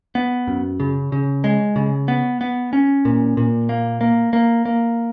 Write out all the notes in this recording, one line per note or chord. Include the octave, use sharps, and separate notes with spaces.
B3
F#2
C#3
C#3
G#3
C#3
B3
B3
C#4
A#2
A#2
A#3
A#3
A#3
A#3